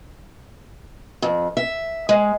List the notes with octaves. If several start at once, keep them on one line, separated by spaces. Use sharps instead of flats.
F2
E5
G#3